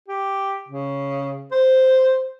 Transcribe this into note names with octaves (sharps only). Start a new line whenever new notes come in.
G4
C#3
C5